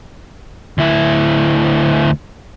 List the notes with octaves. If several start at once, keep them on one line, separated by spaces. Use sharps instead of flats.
D2 E4